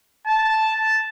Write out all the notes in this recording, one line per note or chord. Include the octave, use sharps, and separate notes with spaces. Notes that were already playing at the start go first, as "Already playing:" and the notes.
A5